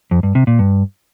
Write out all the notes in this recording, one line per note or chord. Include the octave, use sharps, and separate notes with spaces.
F2
G2
C3
A#2
G2